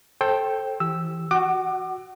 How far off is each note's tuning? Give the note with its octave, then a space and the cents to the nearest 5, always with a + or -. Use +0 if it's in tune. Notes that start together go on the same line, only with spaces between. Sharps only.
A4 +0 C5 +25 G5 +0
E3 +0 G4 +0 E6 +0
F#4 +0 F#5 +30 D6 +30